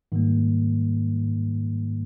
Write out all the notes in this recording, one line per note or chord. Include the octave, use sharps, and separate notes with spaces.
G#2 D#3 G3 A#3